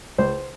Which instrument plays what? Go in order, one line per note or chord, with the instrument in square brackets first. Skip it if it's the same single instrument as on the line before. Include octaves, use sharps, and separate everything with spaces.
[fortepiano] C#2 C5